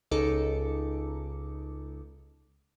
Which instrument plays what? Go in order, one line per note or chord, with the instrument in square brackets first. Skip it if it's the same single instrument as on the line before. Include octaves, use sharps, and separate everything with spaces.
[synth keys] C#2 C#3 D#4 A4 D6 C#7